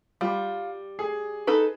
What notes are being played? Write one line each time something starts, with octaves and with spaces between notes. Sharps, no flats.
G3 F4
G#4
D#4 A4 B4